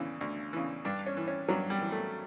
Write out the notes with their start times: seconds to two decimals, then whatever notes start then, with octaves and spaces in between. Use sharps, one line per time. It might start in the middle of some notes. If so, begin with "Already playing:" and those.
Already playing: D2 C#3 E3
0.21 D2
0.53 C#3 E3
0.85 G2 D4
1.06 C#4
1.17 E3
1.28 C#4
1.49 G2 F#3
1.70 G3
1.81 E3
1.92 A3